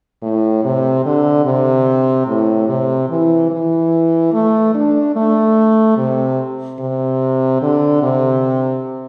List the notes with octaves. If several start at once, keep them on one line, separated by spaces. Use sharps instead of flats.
A2
C3
D3
C3
A2
C3
E3
E3
A3
D4
A3
C3
C3
D3
C3